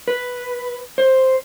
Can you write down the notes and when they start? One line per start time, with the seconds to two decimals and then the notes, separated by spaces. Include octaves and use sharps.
0.08 B4
0.98 C5